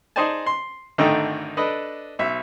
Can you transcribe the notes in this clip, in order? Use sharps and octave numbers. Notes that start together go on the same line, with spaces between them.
D#4 G#4 C5 D5 G#5 A5
C6
G#1 D3 D#3 A3 D#4 G5
D4 A4 B4 D5 D#5
B1 E5